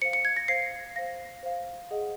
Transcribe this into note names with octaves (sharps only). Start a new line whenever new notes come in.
C5 F5 C#7
C#7
G#6
A#6
C5 F5 C7
C5 F5 A#6
C5 F5
G#4 D#5 F#5